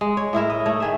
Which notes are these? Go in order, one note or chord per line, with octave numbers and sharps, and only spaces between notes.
G#3
C#5
A2 E4 A#4 E5
D#5
A3 D#4 C#5
D#3 G#4 E5